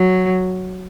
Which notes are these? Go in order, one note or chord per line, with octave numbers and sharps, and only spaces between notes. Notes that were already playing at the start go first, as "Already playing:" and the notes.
Already playing: F#3